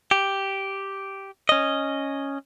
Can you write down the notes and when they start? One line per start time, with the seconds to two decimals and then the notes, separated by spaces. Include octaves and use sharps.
0.11 G4
1.49 C#4 D#5